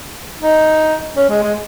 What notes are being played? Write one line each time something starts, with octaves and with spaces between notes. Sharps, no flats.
D#4
C#4
G#3
G#3